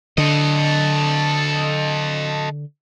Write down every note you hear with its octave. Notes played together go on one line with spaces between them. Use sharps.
D3 A4 D#5